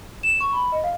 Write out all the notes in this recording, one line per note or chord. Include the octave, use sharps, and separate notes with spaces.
E7
C#6
B5
D#5
F5